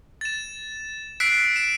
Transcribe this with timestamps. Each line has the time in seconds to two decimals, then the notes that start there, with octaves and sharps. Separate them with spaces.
0.21 A6 E7
1.20 E6 F#6 B6 C7 D7
1.56 D7 E7